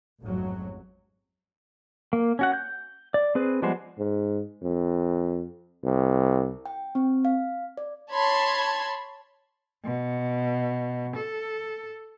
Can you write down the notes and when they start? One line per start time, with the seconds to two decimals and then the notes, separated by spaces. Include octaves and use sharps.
0.21 A1 F2 G#2 F#3
2.13 A#3
2.39 C#4 F#4 F#5
2.53 G6
3.14 D5
3.35 C4 G#4 B4
3.62 F3 G3 G#3 B3 C5
3.99 G#2
4.62 F2
5.85 C2
6.66 G5
6.95 C4
7.25 F5
7.77 D5
8.12 C#5 A5 B5 C6 G#6
9.85 B2
11.16 A4